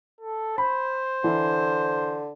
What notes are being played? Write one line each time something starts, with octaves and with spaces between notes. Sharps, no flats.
A4
C5 B5
D3 E3 E4